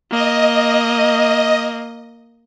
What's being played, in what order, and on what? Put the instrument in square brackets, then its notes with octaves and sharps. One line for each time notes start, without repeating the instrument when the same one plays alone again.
[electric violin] A#3 [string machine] D#5